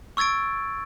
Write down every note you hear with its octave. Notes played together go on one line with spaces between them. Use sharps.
C#6 E6 G#6 A6 D7